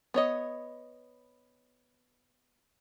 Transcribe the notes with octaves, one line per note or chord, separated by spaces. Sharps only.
B3 C#5 D#5